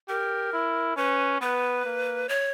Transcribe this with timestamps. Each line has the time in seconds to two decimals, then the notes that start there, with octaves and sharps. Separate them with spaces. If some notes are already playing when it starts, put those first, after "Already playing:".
0.09 G4 A#4
0.53 E4
0.97 C#4 B4
1.41 B3 B4
1.85 A#3
2.29 C#5